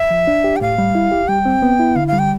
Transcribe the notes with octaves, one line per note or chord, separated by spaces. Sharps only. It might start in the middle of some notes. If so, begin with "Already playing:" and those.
Already playing: E5
F3
D4
G4
G5
A2 F5
G3
E4
G4
G3 G5
C4
B3
E4
D3 F5
F5
G3
G5